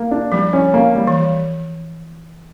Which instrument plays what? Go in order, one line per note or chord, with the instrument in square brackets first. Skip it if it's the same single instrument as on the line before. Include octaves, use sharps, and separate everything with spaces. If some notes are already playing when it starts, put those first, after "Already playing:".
Already playing: [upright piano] A#3
D4
[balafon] F3 [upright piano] G3
[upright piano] C#4
A#3
G3
[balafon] E3